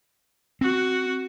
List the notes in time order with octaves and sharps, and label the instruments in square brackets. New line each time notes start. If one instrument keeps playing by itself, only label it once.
[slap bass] C4 [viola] F#4